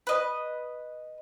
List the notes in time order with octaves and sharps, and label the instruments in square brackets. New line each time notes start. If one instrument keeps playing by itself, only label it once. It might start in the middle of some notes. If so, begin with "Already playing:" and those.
[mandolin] B4 D#5